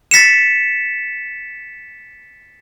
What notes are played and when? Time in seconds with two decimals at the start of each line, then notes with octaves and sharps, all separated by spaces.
0.11 A6 B6 C#7 E7